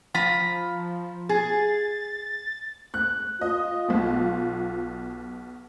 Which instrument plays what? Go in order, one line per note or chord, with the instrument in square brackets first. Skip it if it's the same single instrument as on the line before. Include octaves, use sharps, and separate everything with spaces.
[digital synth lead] F3 [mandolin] F4 A#5 B5
[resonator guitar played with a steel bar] G#4 [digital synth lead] A6
[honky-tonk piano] F#6
[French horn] F4 [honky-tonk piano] D#5
[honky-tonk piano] B1 B2